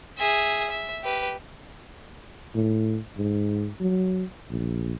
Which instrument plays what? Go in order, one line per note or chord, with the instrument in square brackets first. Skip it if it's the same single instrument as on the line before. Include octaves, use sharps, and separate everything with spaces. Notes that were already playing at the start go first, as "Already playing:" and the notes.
[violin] G#4 E5
E5
G4 B4
[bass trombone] A2
G#2
F#3
A#1